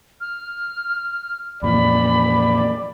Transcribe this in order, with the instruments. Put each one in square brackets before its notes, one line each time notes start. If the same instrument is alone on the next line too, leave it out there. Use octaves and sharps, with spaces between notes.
[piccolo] F6
[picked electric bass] F2 A#2 E3 [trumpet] D5 [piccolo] B5